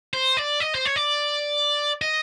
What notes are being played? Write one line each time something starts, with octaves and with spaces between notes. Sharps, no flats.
C5
D5
D#5
C5
C#5
D5
D#5